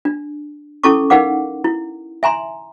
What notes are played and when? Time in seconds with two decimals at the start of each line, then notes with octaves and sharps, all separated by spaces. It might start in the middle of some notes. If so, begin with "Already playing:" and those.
0.05 D4
0.84 C#4 E4 A4 A5 C#6 D6
1.10 D#4 A#4 F5 F#5 D6
1.64 E4
2.23 E5 G#5 A#5 C6